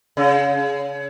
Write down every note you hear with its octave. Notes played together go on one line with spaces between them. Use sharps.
C#3